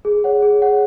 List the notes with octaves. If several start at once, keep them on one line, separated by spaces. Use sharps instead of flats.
G#4
C#5 F#5
G#4
C#5 F#5